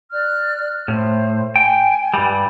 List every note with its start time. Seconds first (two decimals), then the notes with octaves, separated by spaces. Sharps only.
0.11 D5 F6 F#6
0.88 A2 C5
1.56 G5 G#5
2.14 G2 G3